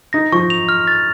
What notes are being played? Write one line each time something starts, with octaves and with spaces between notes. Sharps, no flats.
D#4 A#6
F3 C#6
F7
F6
A6